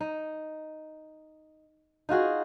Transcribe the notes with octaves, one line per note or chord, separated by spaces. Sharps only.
D#4
D#4 F4 F#4 G#4